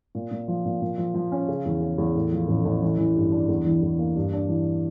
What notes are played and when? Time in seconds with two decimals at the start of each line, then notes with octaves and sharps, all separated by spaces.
0.15 A#2
0.31 A#2
0.48 F3
0.65 A#2
0.81 A#2
0.98 F3
1.14 F3
1.32 C#4
1.48 C#3
1.65 E2
1.81 C#3
1.98 E2
2.15 A2
2.32 F3
2.48 A1
2.65 A1
2.83 E3
2.98 E3
3.15 G2
3.32 D4
3.49 E2
3.66 E3
3.82 E2
3.99 A#3
4.16 G2
4.33 D4
4.49 E3